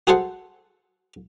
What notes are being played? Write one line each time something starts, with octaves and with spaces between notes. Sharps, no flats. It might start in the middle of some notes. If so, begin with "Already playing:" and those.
F#4 G#4 A4 C5 F#5